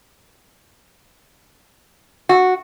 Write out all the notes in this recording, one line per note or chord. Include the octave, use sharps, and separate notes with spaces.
F#4